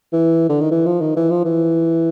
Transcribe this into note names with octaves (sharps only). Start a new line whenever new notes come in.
E3
D3
D#3
E3
F3
D#3
E3
F3
E3